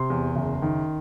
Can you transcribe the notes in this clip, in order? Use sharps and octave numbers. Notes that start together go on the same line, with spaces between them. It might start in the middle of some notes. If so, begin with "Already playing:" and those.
Already playing: C3 C6
E2
F#1
D#3